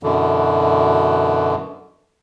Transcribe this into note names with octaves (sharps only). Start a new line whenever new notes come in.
F#2 B2 D3 E3